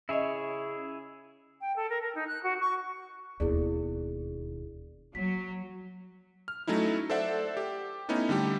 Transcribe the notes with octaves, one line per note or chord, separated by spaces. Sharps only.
C#3 E4 G#4 C#5 D#5 E5
G5
A4
A#4
A#4
D#4
F#6
F#4
C#6
E1 D#2 E4 G#4 D5
F#3 A#3 B6
F6
F#3 A3 C#4 D#4 E4
A4 C5 D5 E5 F#5
G4
A3 B3 C#4 D#4 E4
D3 G3 A3 G4